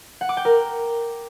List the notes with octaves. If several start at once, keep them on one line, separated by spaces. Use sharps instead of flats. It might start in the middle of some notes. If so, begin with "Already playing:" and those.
F#5
D6
G5
A#4